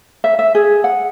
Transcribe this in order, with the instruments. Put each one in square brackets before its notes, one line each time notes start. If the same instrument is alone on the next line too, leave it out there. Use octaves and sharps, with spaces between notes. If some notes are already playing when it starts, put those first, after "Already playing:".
[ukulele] E5
E5
G#4
F#5